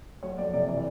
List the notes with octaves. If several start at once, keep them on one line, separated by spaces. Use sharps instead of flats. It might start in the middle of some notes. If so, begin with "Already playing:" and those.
F#3 C#5
F2 D5
C3 D5
E3 D5